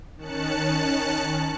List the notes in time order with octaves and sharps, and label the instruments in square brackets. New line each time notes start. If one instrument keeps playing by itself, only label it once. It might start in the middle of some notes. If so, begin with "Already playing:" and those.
[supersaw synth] D#3 C#4 A5 F#6 C#7